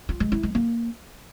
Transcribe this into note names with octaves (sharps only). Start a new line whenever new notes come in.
F4
G#3
E4
G#3
A#3